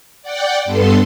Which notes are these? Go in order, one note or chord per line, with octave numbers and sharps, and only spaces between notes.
D5 F#5 G5
G2 B3 A4 C6